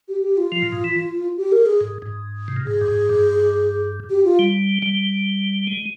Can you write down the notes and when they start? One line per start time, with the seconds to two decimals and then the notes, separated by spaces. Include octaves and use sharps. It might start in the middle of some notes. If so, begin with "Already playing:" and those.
0.08 G4
0.22 G4
0.37 F4
0.52 F3
0.62 A#2
0.72 G#2
0.84 E3
1.37 G4
1.52 A#4
1.66 G#4
1.81 G#2
2.02 G#2
2.48 C3
2.56 A#2
2.66 G#2 G#4
2.81 G2
2.88 G#2
3.09 G2
4.10 G4
4.25 F4
4.39 G3
4.82 G3
5.67 G#3